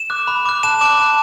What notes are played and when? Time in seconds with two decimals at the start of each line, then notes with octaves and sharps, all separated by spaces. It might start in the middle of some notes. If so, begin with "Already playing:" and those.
Already playing: E7
0.10 D6 F#6
0.28 B5
0.45 D6 F#6
0.63 A5 E7
0.81 D6 F#6
0.99 A5